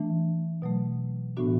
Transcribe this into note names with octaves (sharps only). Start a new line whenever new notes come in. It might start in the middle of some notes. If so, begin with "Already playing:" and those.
Already playing: E3 A3 D4
B2 F#3 A3
A2 E3 B3 D4 F#4